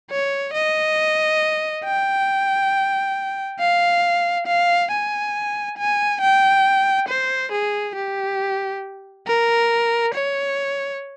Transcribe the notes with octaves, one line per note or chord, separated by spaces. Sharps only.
C#5
D#5
G5
F5
F5
G#5
G#5
G5
C5
G#4
G4
A#4
C#5